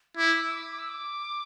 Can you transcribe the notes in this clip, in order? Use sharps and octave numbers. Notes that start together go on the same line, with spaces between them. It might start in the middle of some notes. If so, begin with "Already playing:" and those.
E4 D6
E6
D6
D6
E6
D6